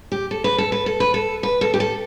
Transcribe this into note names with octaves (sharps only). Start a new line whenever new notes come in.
G4
A4
B4
A4
B4
A4
B4
A4
B4
A4
G4
A4